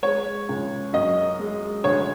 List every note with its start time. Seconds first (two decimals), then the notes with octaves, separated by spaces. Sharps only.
0.03 G#3 C#5
0.49 C#2
0.93 F#2 D#5
1.39 G#3
1.84 D2 C#5